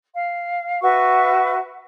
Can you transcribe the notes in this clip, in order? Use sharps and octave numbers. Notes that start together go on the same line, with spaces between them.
F5
F#4 B4 E5 C#6